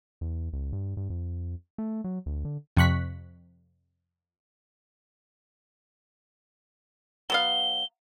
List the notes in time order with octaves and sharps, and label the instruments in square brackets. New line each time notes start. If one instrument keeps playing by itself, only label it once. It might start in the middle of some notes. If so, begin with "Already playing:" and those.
[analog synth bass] E2
C#2
G2
G2
F2
A3
F#3
D2
D3
[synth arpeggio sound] F2 C3 C#6 F#6 B6
[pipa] F#3 B3 F5 [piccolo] G7